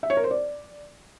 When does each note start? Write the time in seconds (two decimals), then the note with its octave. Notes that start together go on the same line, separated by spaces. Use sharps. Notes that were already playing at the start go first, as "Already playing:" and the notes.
0.03 E5
0.10 C#5
0.17 A#4
0.24 C5
0.31 D5